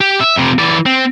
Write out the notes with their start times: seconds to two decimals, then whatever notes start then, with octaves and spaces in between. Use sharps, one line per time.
0.01 G4
0.20 E5
0.36 F2 C3
0.59 E3 D5
0.86 C4